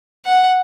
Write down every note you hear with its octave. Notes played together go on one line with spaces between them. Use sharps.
F#5